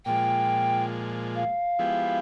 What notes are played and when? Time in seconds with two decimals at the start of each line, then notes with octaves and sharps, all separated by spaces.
0.06 A#2 F3 G#3 G5
1.35 F5
1.79 F3 G#3 B3 E4 G4